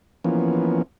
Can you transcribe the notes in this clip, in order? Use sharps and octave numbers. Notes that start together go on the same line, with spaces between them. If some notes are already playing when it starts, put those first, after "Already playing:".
E3 F3 A#3 B3 C#4